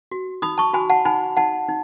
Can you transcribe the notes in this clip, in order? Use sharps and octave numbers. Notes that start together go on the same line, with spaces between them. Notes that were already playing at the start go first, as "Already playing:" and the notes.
F#4
D#4 B5 D#6
A5 C#6
F#4 G#5 B5
F#5 A5
D#4 G#5 B5
D#4 F#5 A5
D#4